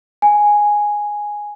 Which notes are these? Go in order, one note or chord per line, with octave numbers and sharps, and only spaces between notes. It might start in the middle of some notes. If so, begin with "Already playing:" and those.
G#5